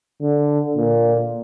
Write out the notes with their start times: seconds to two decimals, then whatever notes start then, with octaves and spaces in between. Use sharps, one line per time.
0.22 D3
0.77 A#2